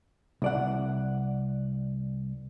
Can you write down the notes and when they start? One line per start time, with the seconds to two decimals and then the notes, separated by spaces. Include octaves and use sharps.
0.42 C2 D5 F#5